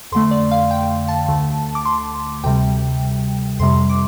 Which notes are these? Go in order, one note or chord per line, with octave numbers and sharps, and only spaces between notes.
F2 D3 A3 C6
D5
F5
G5
A5
D2 D3 A3
D6
C6
D2 C3 G3 G5
F2 C3 G3 C6
D6